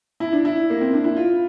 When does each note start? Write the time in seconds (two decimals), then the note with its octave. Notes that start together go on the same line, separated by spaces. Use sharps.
0.20 E4
0.33 D4
0.45 E4
0.70 A#3
0.81 C4
0.93 D4
1.04 E4
1.17 F4